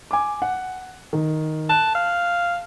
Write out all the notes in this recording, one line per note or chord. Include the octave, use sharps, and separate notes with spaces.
G#5 D6
F#5
D#3
A5 F#6
F5